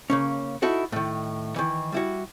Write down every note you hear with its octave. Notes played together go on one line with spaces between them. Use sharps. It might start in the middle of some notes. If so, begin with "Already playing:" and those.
C#3 A#3 C#4
D#4 E4 F#4 A4
A2 D#3
D#3 E3
G3 E4 F#4